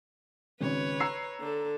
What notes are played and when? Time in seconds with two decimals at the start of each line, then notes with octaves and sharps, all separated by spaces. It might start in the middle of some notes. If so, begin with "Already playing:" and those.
0.61 G#1 C#3 B4 C#5
1.00 A#5 E6 C7
1.40 D3 A4